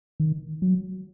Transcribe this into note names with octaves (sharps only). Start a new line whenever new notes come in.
D#3
F#3